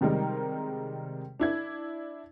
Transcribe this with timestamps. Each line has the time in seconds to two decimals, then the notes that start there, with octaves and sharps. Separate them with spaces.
0.01 C3 D#3 G3 G#3 D#4 A#4
1.40 D4 E4 G#6